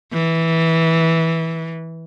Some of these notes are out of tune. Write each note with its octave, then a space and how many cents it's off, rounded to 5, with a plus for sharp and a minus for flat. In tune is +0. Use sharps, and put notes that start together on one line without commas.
E3 -10